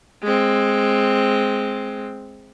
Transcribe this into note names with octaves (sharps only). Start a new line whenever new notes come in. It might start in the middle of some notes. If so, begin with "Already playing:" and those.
G#3 C4